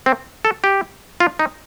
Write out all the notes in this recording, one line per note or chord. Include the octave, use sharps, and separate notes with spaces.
C4
A4
G4
F4
D#4